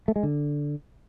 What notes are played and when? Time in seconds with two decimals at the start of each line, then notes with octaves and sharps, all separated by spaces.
0.08 A3
0.16 G#3
0.23 D3